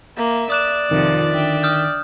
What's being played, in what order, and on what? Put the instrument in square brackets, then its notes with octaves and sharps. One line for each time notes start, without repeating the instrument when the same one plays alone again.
[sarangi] A#3 [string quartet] E5
[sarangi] D5 [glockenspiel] D#6 F#6 E7
[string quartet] F2 C3 F3 [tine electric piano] D#3
[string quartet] D3 E5 G5
[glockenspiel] D#6 F6 G6